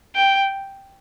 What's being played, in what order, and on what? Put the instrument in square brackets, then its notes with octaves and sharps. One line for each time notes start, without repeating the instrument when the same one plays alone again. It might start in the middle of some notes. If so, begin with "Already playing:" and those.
[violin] G5